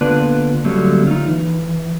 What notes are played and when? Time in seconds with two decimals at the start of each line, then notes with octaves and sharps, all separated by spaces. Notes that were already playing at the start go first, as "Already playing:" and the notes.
0.01 D3 A#3 B3 D4 F4 B4
0.65 D3 F#3 G3 A3 A#3 C#4
1.07 D#4 F4
1.28 E3